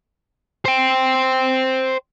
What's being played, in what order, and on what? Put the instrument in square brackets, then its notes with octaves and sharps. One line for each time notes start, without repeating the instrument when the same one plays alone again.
[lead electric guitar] C5 G5